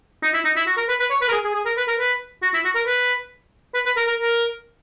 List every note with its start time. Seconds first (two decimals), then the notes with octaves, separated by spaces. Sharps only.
0.23 D#4
0.34 E4
0.45 D#4
0.56 E4
0.67 F#4
0.77 A#4
0.89 B4
1.00 B4
1.11 C#5
1.22 B4
1.29 A#4
1.32 G#4
1.44 G#4
1.55 G#4
1.65 A#4
1.77 B4
1.88 A#4
1.99 B4
2.43 F#4
2.54 E4
2.65 F#4
2.75 A#4
2.86 B4
3.74 B4
3.86 B4
3.97 A#4
4.07 A#4
4.19 A#4